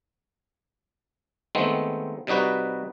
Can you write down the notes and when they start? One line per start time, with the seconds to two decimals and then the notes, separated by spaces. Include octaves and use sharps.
1.55 D#3 G#3 A3 B3 C4
2.27 C3 G3 D#4 F#4 B4